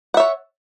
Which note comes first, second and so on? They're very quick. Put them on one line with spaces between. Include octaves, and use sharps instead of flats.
F#5 E5 C#5